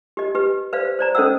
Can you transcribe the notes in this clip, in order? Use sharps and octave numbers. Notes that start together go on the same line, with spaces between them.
G4 D#5
G4 B4
B4 C5 D5 F5
C5 D5 A#5
C#4 A4 C5 D#5 F#5 E6